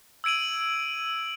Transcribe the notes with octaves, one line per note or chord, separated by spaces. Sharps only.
E6 G#6 D7 D#7 F#7